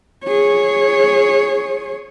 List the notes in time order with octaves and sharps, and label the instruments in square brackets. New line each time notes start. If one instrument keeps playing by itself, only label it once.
[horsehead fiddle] G#4 C#5